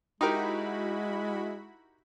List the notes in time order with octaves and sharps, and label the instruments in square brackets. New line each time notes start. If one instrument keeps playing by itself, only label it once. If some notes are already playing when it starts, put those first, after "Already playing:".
[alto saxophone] G#3 [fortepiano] D#4 G4 A#4 [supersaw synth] E4 F#4 B5